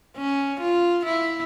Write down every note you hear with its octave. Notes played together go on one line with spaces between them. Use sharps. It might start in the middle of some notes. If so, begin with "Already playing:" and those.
C#4
F4
E4